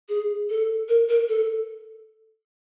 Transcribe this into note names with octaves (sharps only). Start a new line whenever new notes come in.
G#4
A4
A#4
A#4
A4